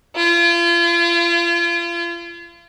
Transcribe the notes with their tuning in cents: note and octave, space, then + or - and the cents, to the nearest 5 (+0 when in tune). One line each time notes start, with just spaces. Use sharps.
F4 -40